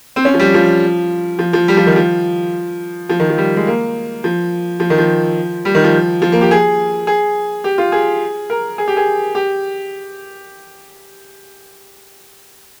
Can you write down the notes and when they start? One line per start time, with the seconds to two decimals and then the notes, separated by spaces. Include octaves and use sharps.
0.16 C4
0.25 C#4
0.34 F3
0.40 G3
0.54 F3
1.39 F3
1.53 F3
1.68 G3
1.77 F3
1.86 D#3
1.96 F3
3.09 F3
3.20 D#3
3.29 F3
3.38 G3
3.56 G#3
3.67 A#3
4.24 F3
4.80 F3
4.90 D#3
4.98 F3
5.65 G3
5.75 D#3
5.84 F3
6.22 F3
6.32 A#3
6.41 G4
6.51 G#4
7.07 G#4
7.64 G4
7.78 F4
7.92 G#4
8.50 A#4
8.78 G#4
8.88 G4
8.97 G#4
9.35 G4